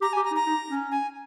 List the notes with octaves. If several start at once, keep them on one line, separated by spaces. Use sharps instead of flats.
G4 A#5
G#5
G4
A#5
D#4
A#5
D#4
C#4
G#5